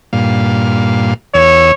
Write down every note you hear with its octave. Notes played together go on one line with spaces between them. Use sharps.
G2 A#2 F5
E2 C#5 E6